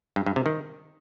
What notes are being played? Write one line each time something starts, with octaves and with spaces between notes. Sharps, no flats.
G2
G2
C3
D#3